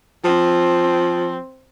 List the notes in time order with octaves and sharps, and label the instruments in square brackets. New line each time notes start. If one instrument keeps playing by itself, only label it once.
[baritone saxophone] F3 [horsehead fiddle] C4